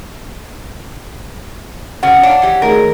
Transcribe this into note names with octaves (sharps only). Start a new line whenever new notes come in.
C#3 C#4 F#4 F#5
D4 C#5 F5
E3 G4
D#3 A3 G#4 A#4